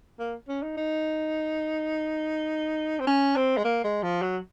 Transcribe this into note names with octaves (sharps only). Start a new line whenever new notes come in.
A#3
C#4
D#4
D#4
C4
C#4
C4
G#3
A#3
G#3
F3
F#3